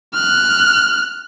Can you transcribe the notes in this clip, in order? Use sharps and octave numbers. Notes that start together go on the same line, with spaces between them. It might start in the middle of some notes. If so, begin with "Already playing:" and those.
F6 F#6